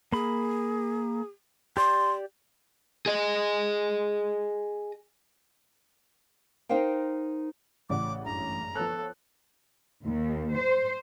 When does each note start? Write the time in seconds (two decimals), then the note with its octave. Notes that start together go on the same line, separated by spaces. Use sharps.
0.12 A#3 G#4 B5
1.77 G4 D5 C6
3.06 G#4 D#5
6.69 D#4 A#4 C5 F5 G5
7.90 A1 C#3 D5 F#5 D6
8.25 F#1 G2 A#5
8.76 F3 B3 A4 C#5 F#6
10.04 D#2
10.56 C5